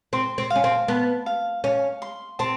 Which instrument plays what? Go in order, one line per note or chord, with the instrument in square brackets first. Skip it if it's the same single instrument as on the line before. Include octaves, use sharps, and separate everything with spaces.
[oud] C4 [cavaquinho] C6
[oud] C4
[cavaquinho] F5
[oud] C#4
C4
[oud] B3 [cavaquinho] A5
[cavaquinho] F5
[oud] C#4 [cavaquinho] F5
[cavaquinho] C6
[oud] C4 [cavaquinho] A5